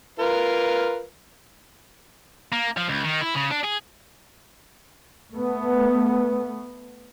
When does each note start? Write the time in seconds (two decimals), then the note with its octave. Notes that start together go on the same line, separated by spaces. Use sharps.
0.19 F4 A#4 B4
2.53 A#3
2.77 F3
2.89 C#2
3.04 D#3
3.21 E4
3.34 C#3
3.51 D4
3.64 G#4
5.33 A3 B3